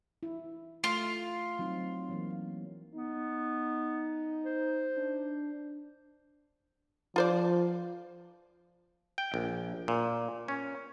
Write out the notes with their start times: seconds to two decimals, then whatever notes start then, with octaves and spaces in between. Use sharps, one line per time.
0.23 E4
0.84 A3 F4
1.59 F#3 C4 D#4
2.09 E3 F#3 A#3
2.95 B3 D#4
4.45 C5
4.98 D4
7.16 F3 F4 C5 D5
9.18 G5
9.34 A#1
9.88 A#2
10.48 C#4